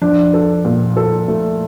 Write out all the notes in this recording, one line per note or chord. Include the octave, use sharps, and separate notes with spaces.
F3 D4
A4
A#2
A4
A3